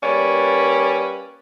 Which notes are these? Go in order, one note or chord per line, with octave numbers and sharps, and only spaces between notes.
G3 A#3 C#4 B4 D5